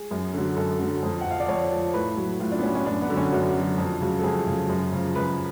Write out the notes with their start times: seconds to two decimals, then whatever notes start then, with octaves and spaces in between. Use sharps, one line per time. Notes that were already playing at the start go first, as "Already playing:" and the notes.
Already playing: G#4
0.11 F#2
0.33 D3 F#3
0.56 F#2 A4
0.80 D3 F#3
1.03 F2
1.21 F3 F#5
1.31 F5
1.40 D5
1.48 F2 C#5
1.71 F3
1.94 A2 B4
2.17 F#3
2.40 A2 F4
2.52 D4
2.59 B3
2.63 F#3 C#4
2.75 C#4
2.86 F#2 D4
3.02 B3
3.10 D3 F#3
3.17 C#4
3.32 F#2 F#4
3.55 D3 F#3
3.78 F2
4.01 C#3 F#3
4.19 A4
4.24 F2 G#4
4.47 C#3 F#3
4.69 F#2
4.93 C#3 F3
5.16 F#2 B4